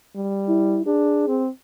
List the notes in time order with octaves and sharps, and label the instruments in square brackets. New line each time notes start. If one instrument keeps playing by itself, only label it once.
[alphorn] G3
[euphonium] E4
[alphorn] D4 [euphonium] G#4
[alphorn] C4